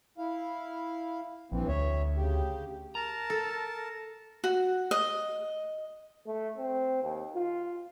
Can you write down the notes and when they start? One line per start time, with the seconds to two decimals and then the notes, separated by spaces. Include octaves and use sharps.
0.18 E4 F5
1.52 A#1 G2 E3 C4
1.68 D2 C#5 E5
2.17 C#3 G4
2.95 A#4 A5 A#5
3.30 A4
4.44 F#4
4.91 D#5
6.27 A3
6.58 C4
7.03 D#2
7.36 F4